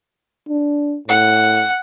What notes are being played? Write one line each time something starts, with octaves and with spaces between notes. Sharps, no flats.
D4
A2 F#5